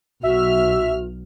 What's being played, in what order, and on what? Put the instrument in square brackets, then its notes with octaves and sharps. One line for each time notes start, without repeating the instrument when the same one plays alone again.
[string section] B1 F6 [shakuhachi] F#4 [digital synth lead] E5